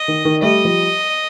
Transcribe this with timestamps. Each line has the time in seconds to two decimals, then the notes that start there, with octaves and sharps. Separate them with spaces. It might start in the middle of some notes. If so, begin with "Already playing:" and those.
Already playing: D#5
0.08 D#3
0.25 D#3
0.42 G3 A3 D#5
0.65 F3 G3